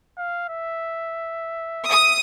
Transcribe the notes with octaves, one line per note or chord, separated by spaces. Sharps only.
F5
E5
D#6